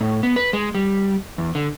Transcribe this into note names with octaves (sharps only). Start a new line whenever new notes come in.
A2
B3
B4
G#3
G3
E2
D3